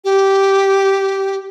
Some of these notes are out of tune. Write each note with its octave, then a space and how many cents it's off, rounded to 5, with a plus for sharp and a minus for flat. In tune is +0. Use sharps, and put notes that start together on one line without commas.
G4 -10